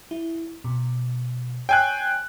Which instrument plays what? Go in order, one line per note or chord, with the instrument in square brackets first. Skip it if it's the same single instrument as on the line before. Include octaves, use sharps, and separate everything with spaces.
[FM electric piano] E4
B2
[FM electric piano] C#5 E6 C7 [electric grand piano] G5 G#5 F#6